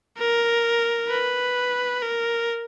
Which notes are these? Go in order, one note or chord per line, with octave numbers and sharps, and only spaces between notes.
A#4
B4
A#4